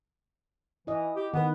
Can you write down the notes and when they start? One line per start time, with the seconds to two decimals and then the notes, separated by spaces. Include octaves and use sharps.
0.87 E3 E4 D#5
1.16 G4
1.34 D#3 B3 B4